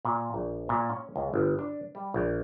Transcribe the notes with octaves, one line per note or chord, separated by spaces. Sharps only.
A#2
A#1
A#2
C#4
C#2
G1
D4
G3
A#1